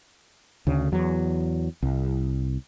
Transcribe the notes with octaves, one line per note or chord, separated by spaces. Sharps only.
D2 C#3
E2 F#3
C2